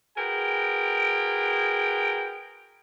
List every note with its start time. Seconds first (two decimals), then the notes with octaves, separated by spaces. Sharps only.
0.18 F#4 G#4 A#4 B4 G5